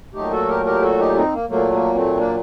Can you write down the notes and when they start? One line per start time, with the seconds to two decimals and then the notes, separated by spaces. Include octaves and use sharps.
0.14 A#2 F#3 A3 D#4 G4
0.31 F#4 A4
0.48 G4 A#4
0.66 G4 A#4
0.82 F#4 A4
0.99 D#4 G4
1.16 C4 D#4
1.33 A#3
1.49 A#2 F#3 A3 A#3
1.72 A#3
1.94 A3 C4
2.17 A#3 D4